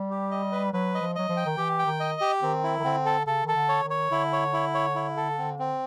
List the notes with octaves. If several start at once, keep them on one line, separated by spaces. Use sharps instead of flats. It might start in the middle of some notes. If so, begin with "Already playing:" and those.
Already playing: G3
G4
D#5
B4
F#3 B4
D#5
F3
F#3 D#5
F3
G5
D#3
E3 G4
G5
D#3
D#5
G4
D#3 C4
E4
D#3
D3 C4
A4
C#3 A4
D#3 A4
D3
C#5
D#3
C#5
D3 E4
C#5
E4
C#5
E4
A4
C4
C4